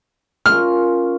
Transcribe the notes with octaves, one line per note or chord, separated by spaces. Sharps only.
C#4 F4 A#4 F6